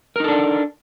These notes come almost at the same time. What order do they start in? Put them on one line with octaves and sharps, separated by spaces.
A#4 D#4 A4 D4